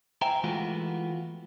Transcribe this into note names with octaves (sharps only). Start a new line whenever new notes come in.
C5 E5 G5 G#5 A#5
E3 G#3 A3 B3 F4 F#4